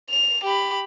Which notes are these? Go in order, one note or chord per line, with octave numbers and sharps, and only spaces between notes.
F7
G4 B5